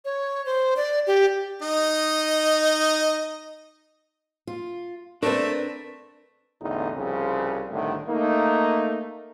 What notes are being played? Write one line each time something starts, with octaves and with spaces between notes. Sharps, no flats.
C#5
C5
D5
G4
D#4 D#5
F4
A3 C4 D4 A#4 B4 D5
A1 E2 D3 D#4
C2 C#3 F3 C4
C2 A2 D3 D#3
A3 A#3 D#4